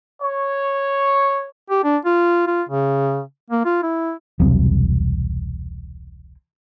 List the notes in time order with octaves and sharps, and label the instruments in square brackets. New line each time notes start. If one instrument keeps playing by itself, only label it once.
[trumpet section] C#5
[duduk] G4
D4
F4
F4
C#3
A#3
F4
E4
[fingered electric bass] E1 C2 F#3 C4